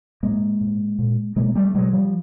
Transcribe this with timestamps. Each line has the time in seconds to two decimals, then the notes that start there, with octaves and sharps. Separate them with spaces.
0.23 A2 G#3 A#3
0.61 A2
0.99 A#2
1.36 B2 G#3 A#3
1.55 G3 A3
1.74 B2 F#3 G#3
1.93 F3 G3